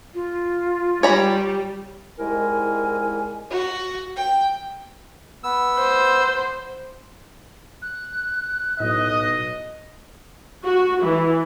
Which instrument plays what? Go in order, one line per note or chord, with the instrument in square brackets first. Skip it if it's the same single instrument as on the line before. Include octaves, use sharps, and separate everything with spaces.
[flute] F4
[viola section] G3 [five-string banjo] C#5 A#5 B5
[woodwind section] C2 G#2 G#3 E4 A#4 G#5
[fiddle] F#4
G5
[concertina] B3 E6
[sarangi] C5
[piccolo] F#6
[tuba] B1 [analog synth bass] A2 [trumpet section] D#5
[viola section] F#4
E3